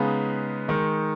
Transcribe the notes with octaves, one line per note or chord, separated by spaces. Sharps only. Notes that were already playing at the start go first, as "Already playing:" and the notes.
Already playing: C#3 G#3 B3 D#4 B4
D#3 G#3 D#4